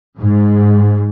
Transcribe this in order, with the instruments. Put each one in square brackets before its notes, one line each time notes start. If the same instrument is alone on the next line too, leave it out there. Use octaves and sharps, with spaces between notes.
[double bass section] G#2